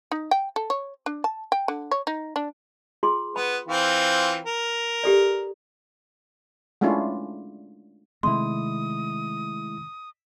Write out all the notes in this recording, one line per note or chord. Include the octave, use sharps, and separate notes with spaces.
D#4
G5
A4
C#5
D4
A5
G5
D3
C#5
D#4
D4
F4 G#4 C6
B3 B5
E3 C4 F4
A#4
G4 A4 D5
G#3 A3 C#4 D4 E4 F4
C3 D#3 G#3 A3 C4 E4 C6 D#6